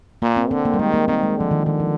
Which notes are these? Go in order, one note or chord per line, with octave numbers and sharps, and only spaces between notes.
A#2 A#3
C4
D3 C4
A#3
G3
D#3 G#3
A#3
D#3 C4
G#3
D3 F3
D#3
D3 D#3
F3